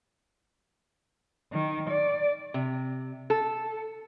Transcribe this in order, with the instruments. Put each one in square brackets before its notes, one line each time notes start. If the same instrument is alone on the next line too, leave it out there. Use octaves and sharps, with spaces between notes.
[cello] D#3
D5
[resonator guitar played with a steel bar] C3
A4